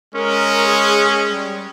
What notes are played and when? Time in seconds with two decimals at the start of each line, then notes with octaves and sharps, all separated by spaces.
0.15 G#3 C#4 A#4
0.67 G#4
1.29 G3